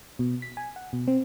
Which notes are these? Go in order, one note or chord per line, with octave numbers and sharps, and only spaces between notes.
B2
B6
G#5
F#5
B2
C4